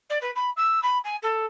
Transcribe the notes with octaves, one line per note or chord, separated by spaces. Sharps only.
D5
B4
B5
E6
B5
G#5
A4